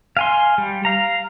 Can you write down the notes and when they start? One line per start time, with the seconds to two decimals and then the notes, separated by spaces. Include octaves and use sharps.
0.17 F5 G#5 C6
0.58 G3
0.85 F5 A#5